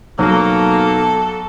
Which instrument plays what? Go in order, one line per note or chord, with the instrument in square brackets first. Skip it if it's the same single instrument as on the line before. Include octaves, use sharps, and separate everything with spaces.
[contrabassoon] B1 [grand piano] F#3 [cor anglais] A#3 [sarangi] A4